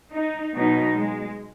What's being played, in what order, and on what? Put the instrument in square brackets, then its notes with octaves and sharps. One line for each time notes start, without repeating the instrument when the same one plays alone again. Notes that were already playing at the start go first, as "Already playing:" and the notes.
[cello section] D#4
B2 F#3 D#4
G#3